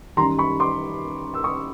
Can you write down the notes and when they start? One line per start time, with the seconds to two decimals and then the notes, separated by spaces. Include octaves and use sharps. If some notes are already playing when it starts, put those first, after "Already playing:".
0.17 F#2 D#3 G3 A#5 C6
0.39 B5 C#6
0.60 C6 D6
1.34 E6
1.44 C#6 D#6